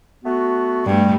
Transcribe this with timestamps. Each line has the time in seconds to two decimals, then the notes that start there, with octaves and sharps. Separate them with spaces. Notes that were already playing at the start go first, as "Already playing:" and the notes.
0.24 A3 B3 F#4
0.86 G2 G3 A3